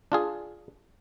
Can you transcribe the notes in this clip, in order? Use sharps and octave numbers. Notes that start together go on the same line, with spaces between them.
D4 F4 G#4